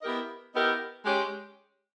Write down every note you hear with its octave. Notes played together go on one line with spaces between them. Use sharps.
B3 E4 G4 A#4 D#5
B3 E4 G4 A#4 D#5
G#3 C#4 G4